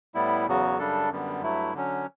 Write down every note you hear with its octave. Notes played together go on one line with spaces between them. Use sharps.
A2 G3 B3 E4
E2 C#3 F#3 B3 F#4
F#2 C#3 G3 D4 A4
F#2 D3 G3 B3
G2 F#3 A3 E4
D3 F#3 C#4